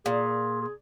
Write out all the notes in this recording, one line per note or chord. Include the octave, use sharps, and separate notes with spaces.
A#2 G#4
G#4